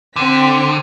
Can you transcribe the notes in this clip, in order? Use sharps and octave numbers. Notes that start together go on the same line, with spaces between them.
D3 C4 B6